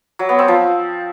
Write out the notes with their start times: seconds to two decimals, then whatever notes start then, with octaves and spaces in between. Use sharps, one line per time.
0.19 F#3
0.29 B3
0.39 C4
0.48 F3